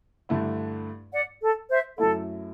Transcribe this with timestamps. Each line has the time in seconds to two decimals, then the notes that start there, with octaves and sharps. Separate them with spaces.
0.29 G2 D3 A3 E4
1.13 D5 F#5
1.42 A4
1.70 C5 E5
1.98 F#2 F#3 A3 E4 A4